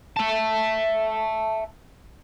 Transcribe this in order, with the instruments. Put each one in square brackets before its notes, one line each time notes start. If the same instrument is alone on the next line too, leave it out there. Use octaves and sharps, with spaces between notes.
[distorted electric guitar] E5 A5